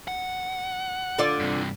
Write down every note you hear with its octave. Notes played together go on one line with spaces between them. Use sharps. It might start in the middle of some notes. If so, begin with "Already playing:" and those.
F#5
D3 F4 D5
G2 C3